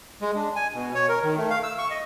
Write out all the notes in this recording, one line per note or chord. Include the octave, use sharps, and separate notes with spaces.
G#3
D4
G#5
B2
C#5
A#4
D#3
A3
F5
E6
C#6
D#5